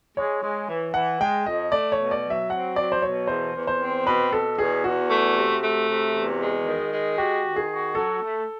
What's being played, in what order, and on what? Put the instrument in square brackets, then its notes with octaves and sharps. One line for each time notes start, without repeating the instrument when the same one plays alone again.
[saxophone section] G#3 [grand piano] C#5
[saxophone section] G#3
E3
[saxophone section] E3 [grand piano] F#5
[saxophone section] G#3 [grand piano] G5
[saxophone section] F2 [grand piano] D#5
[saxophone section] A3 [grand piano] D5
[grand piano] C#5
[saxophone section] B2
[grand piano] D5
[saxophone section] F#3
[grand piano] E5
[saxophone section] C4 [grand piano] F#5
[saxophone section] F#3 [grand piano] D5
[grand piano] C5
[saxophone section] B2 [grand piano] C#5
[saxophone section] E2 [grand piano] C5
[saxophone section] E2
[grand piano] C5
[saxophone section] C4
[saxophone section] B2 [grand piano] B4
[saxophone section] B2 [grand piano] A4
[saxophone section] E2 [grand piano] G#4
[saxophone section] E2 [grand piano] F#4
[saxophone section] A3
C3
A3
C3
E2
G#3
D#3
G#3
[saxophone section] F#4 [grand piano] G4
[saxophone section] D#3
[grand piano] G#4
[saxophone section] F#4
[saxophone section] F#3 [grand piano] A4
[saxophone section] A3